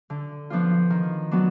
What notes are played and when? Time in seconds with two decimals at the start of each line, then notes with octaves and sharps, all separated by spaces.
0.10 D3
0.50 F3 B3 D4 F4
0.90 D#3
1.31 F#3 B3 D4